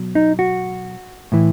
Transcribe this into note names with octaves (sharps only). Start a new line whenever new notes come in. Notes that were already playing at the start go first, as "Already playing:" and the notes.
Already playing: B2 F#3
D#4
F#4
A2 E3